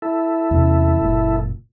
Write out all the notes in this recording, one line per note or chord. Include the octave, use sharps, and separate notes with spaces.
E4 A4
E2 C3 C#4
F#1 A#2